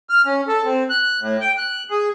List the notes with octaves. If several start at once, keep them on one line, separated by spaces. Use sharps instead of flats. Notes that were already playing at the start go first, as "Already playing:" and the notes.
F6
C#4
A4
C4
F#6
A2
G5
F#6
G#4